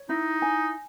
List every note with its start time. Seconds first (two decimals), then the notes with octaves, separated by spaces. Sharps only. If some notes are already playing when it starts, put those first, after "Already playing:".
Already playing: C#5
0.09 D#4 E4
0.42 G#5